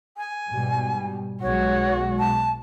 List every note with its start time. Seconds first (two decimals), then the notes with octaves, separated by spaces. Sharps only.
0.17 G#5
0.49 G#2 B2 G3
1.43 B1 B2 G#3 F#4 C#5
2.19 A5